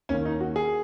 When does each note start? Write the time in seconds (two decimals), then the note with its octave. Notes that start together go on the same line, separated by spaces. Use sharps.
0.09 D#2 D#3 C#4
0.25 D#4
0.40 F#4
0.56 G#4